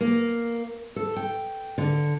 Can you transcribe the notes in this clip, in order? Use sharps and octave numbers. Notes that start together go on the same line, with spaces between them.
A#3
A4
G5
D3